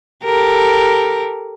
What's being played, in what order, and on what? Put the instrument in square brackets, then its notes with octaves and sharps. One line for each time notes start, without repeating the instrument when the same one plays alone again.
[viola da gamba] G4 A4 A#4